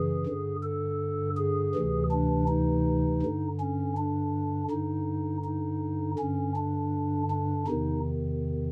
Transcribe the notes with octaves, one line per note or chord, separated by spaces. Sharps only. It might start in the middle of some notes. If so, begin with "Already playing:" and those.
Already playing: F#2 C#3 E3 G#4
G2 D3
A4
G#4
D2 C3 E3
D4
D#4
G2 D3
C#4
D4
G2 D3 D#4
D#4
G2 D3 C#4
D4
D4
E2 C3 D#3 D#4